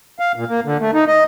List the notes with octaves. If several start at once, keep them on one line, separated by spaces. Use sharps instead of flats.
F5
A#2
A#3
D3
A3
D#4
D#5